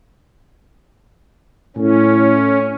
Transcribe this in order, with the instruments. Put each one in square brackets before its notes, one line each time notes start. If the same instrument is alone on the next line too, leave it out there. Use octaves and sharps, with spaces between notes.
[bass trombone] A2 [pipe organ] C#4